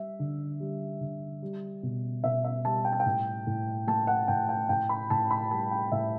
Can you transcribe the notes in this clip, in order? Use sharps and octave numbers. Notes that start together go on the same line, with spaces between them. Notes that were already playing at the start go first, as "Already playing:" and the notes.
Already playing: G3 E5
D3
G3
D3
G3
B2
B2 E5
E5
G3 A5
G5
A5
G5
A2
A2
A3 A5
F#5
A2 G5
G5
A2 G5
B5
A2 A5
B5
G3 A5
G5
A2 E5